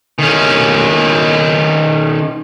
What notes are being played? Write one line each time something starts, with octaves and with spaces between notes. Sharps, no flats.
D#3 C#4